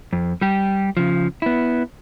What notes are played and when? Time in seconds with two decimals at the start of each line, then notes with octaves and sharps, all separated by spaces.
0.13 F2
0.41 G3 G4
0.97 C#3 F3
1.42 B3 E4